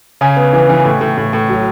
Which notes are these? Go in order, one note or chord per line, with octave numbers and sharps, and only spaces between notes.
C#3 G#5
B3
E3
E3
A2
A2
A2
A2
F#3